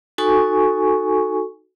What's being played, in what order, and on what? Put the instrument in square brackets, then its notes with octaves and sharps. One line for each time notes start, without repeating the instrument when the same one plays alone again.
[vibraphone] D#4 F#4 A4 G#5 C#6